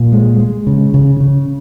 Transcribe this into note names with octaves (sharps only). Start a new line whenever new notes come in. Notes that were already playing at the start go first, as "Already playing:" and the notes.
Already playing: A#2
G#3
G#3
C#3
C#3
C#3